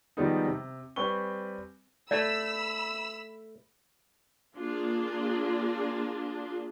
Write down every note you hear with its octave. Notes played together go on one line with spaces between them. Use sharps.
D#3 F3 G3 G#3 B3 D#4
C3
G3 C4 B4 G#5 C#6 G7
A3 D5 B5 E6
A#3 D4 F4 G#4